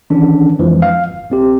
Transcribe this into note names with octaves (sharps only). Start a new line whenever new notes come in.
D#3 E3 C#4 D4
F2 E3 F3 G#3
F5
G1
A#1 C4 G4